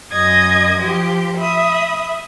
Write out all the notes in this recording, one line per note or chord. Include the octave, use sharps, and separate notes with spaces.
F#2 D#5 D#6 G#6
F3 G4
E5 B5 D#6